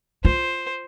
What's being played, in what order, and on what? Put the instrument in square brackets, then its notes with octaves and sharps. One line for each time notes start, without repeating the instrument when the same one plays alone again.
[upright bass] F4 [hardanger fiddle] C5